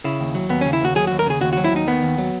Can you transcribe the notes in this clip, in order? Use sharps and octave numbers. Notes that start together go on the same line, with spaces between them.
C#3 E4
D#2
F#3
D#2 B3
C#3 C#4
E4
D#2 F#4
F#3 G#4
D#2 F#4
A#4
C#3 G#4
D#2 F#4
F#3 F#4
E4
D#2 D#4
D#3 B3
D#2
F#3